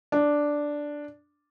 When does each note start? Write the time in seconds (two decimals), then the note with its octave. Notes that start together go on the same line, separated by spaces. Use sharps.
0.12 D4